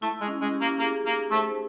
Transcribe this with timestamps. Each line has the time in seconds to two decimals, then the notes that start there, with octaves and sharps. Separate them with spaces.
0.02 A3 E4
0.21 G#3
0.27 C#4
0.41 G#3
0.54 G4
0.61 A#3
0.79 A#3 G#4
1.05 A#3 D#4
1.31 A3 C5